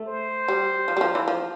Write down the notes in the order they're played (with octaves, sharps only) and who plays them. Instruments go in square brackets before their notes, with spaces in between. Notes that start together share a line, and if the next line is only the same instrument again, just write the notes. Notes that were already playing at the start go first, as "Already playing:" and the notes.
Already playing: [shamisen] A3
[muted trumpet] C5
[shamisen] G3
F3
G3
F3
E3
F3